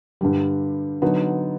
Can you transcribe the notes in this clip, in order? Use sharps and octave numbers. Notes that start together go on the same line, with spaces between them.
G2 D3 G3
D3 F#3 B3 D#4